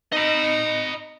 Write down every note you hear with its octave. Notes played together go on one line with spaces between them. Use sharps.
D#4 D#5 A#5 B5